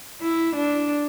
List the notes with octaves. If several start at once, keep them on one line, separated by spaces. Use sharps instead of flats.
E4
D4